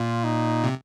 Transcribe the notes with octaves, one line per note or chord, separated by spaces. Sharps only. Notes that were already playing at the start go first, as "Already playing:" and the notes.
Already playing: A#2 F4
D#4
C3